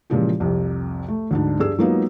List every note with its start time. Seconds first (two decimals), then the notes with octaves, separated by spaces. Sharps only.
0.10 A#2 C#3 E3 F3 G#3 G4
0.40 C2 F2 C3
1.08 A3
1.31 D2 G#2 D4
1.60 G2 G#4 E6
1.79 F#3 G#3 A#3 B3 D#4 F4